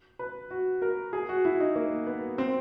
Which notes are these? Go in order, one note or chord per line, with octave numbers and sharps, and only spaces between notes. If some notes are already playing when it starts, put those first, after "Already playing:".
B4
F#4
A#4
G#4
F#4
E4
D#4
A#3
B3
C4